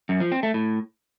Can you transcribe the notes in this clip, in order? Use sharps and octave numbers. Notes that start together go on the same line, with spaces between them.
F#2
F3
C4
A3
A2